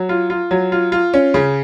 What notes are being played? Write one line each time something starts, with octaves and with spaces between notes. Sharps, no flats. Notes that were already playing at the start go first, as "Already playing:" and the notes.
Already playing: F#3
F4
F4
F#3
F4
F4
C#4
C#3